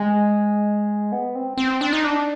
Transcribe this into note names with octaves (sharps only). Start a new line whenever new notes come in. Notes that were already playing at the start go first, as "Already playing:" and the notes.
Already playing: G#3
B3
C4
C4
D4
D#4
D4